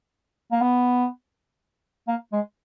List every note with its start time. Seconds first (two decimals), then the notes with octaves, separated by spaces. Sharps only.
0.52 A#3
0.62 B3
2.08 A#3
2.33 G#3